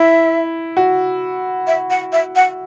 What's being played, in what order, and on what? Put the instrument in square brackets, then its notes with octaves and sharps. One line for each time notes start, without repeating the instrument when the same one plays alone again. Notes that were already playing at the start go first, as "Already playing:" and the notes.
Already playing: [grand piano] E4 [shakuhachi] E5
[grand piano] F#4
[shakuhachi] E5
F#5
E5
F#5